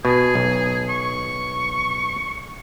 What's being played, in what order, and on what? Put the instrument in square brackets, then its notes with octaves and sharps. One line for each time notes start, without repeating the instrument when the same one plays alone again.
[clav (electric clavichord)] B2 [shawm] G#4
[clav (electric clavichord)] B1
[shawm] C#6